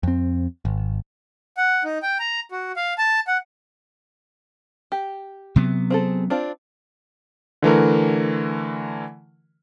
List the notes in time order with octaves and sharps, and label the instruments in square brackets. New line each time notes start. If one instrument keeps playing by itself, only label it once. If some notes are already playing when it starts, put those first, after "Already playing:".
[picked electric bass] F2 C4
G#1
[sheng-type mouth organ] F#5
D#4
G5
A#5
F#4
F5
A5
F#5
[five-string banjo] G4
[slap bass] C3 F#3 B3
[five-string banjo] C4 G#4 A4
C4 D4 F4
[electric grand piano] D3 E3 A3 A#4